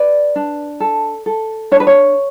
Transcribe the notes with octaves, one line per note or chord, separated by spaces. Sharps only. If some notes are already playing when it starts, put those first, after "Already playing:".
Already playing: B4 D5
D4
A4
A4
D4 C#5
B4
C#5